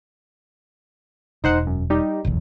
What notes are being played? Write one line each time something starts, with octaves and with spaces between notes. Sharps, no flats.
E1 D#4 C5 F#5
F#2
G3 D#4 G4
F1 B1 E2